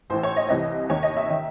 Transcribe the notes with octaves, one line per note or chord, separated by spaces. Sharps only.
A1 A2 E3 C5
C#5
D#5
C2 C3 E3 D#5
D#2 D#3 C#5
D#5
E5
D#3